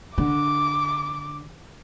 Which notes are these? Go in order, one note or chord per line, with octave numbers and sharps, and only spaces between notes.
D3 D6